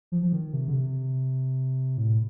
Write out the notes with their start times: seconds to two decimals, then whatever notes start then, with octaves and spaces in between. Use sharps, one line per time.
0.12 F3
0.23 F3
0.33 D#3
0.53 C3
0.68 D3
0.73 C3
1.97 A2